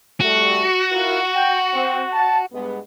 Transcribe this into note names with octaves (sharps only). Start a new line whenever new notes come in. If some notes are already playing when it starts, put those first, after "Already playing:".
C2 G3 A3 F#4
E4 F4 A#4
G5
C4
A5
G2 G#3 B3